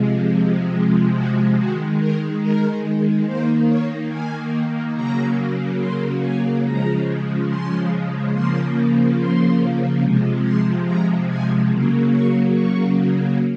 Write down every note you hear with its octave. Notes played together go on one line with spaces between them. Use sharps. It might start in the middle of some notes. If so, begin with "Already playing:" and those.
Already playing: C3 F3 G#3
F#4
D#3 G#3 F#4
A#4
A#4
D#3 A#3 C5
C#5
G#5
C#3 F#3 A#3 A#5
C6
G#5
C#3 F3 G#3 A#5
C6
C#3 F3 A#3 C6
C6
C3 F3 G#3
C6
A#5
G#5
C#3 F#3 A#3
C#6
C#6